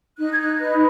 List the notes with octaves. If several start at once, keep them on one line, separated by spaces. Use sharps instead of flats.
D#4 F#6
G#6
F#6
B4 F#6